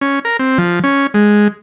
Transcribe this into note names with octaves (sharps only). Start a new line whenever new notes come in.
C#4
A#4
C4
F3
C#4
G#3